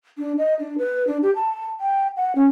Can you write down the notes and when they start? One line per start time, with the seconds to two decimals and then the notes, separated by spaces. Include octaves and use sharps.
0.18 D4
0.38 D#5
0.59 D4
0.78 B4
1.07 D4
1.22 G4
1.36 A5
1.80 G5
2.17 F#5
2.35 C#4